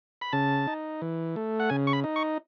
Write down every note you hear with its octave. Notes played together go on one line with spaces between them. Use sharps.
B5
C#3 A5
D#4
E3
A3
F#5
C#3 G#5
C#6
B5
D#4
C#6